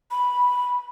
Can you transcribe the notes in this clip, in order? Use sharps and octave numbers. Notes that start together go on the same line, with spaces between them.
B5